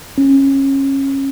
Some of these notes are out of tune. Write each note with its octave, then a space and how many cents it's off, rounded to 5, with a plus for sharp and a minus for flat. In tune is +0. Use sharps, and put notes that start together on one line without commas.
C#4 -25